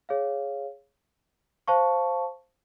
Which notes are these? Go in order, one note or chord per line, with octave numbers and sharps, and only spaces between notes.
G#4 C#5 F5
C5 F5 A5 C#6